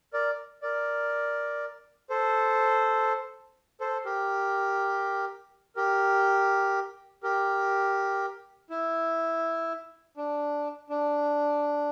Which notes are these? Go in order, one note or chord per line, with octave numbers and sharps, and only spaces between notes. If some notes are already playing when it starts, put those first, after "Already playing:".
A#4 D5
A#4 D5
A4 C5
A4 C5
G4 A#4
G4 A#4
G4 A#4
E4
D4
D4